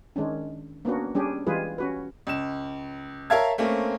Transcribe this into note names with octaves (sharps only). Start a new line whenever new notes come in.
D#3 G#3 C#4 D4
A#3 B3 C#4 D4 F#4
G3 C#4 D4 G4 G#4
E3 G3 G#3 F4 G#4 B4
C#4 F#4 B4
C#2 E7
A#4 C#5 E5 F5 A5 G#6
A3 A#3 C4 C#4